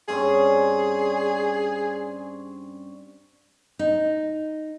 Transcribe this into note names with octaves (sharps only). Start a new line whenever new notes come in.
G2 C4 C#4 G#4
D#4